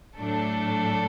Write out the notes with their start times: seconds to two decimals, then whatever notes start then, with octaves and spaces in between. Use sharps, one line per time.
0.18 A2 F#3 A3 D4 A4